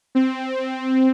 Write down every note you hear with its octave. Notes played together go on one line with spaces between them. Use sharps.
C4